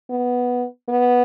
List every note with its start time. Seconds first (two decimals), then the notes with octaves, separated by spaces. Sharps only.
0.10 B3
0.89 B3